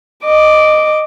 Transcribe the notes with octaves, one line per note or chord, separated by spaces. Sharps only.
D#5 D6